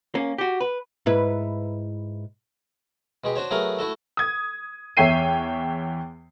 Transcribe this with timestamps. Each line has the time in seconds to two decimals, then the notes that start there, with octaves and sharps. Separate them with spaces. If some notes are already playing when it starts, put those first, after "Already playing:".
0.15 A#3 C#4
0.38 F#4 G4
0.61 B4
1.06 G#2 E4 B4
3.24 B2 G#3 G4
3.36 D4 F#4 C5 C#5
3.51 F#3 A3 B3 G#4 A#4 F5
3.79 A3 E4 F#4 A4
4.17 D#6 G#6
4.97 E2 C#5 E5 G5 C7 D#7